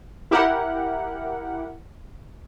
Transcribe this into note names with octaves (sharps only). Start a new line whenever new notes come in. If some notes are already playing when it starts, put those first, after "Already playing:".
E4 G4 A#4 F#5